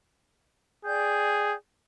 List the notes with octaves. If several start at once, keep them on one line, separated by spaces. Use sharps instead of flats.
G#4 D5 G5 G6